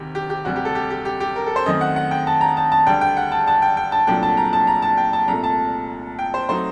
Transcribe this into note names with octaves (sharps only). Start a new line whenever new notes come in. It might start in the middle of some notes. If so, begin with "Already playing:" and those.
Already playing: D2 C3 D#3 G4
G4
G4
D2 C3 G3 F#4
G4
A4
G4
G4
G4
G4
A#4
A4
C5
F#2 D#3 A3 C4 D#5
F#5
F#5
G5
A5
A#5
A5
A5
D2 D3 G3 D4 G5
G5
F#5
A5
A5
G5
G5
A5
C2 A#2 F#3 A3 D4 G5
A5
A#5
A5
A#5
A5
G5
A5
C2 A#2 A3 A#5
A5
G5
C5
F#3 A3 C4 D#4 C5